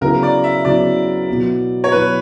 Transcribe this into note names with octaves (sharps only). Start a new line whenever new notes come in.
C#3 F#3 B3 E4 A#4
D5
E5
C#3 F#3 B3 E4 D5
B2 F#3 B3 E4
C#5
B2 F#3 B3 E4 B4